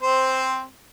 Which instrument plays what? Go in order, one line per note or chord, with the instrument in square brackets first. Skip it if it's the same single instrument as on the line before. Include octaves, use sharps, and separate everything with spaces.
[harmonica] C4 C5